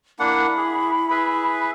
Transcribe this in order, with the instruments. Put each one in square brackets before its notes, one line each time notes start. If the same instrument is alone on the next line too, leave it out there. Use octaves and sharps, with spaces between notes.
[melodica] A#3 D4 F#5 [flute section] E4 B5
[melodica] G#4
G#4 B4 E5